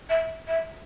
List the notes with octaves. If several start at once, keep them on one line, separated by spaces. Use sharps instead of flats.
E5
E5